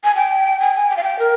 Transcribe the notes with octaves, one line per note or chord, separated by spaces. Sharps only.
G#5
G5
G#5
G5
F5
G5
A#4